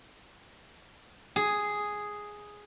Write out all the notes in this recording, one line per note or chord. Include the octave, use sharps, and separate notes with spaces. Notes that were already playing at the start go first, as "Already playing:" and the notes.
G#4